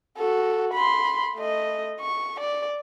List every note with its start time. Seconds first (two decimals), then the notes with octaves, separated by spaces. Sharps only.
0.17 F#4 A4
0.74 B5 C6
1.36 A3 D#5
2.01 C#6
2.40 D5